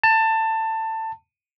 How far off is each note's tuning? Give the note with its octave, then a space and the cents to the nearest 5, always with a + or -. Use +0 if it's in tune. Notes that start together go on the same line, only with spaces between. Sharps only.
A5 +20